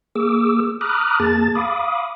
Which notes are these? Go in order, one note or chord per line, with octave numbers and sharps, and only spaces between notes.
A#3 G#4 D6 E6
A#5 B5 D6 D#6 F6 F#6
F2 A#3 G#4 A5 A6
F5 B5 D6 D#6